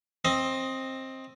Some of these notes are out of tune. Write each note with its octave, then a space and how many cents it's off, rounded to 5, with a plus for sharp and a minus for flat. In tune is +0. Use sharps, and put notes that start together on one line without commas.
C4 +15 D#5 +15